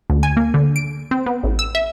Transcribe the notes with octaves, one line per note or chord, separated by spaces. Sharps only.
D2
G#5
A#3
D3
D7
C4
B3
A1
E6
E5